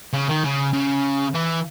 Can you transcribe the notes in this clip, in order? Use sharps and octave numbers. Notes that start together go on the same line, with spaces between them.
C#3
D#3
C#3
C#3
E3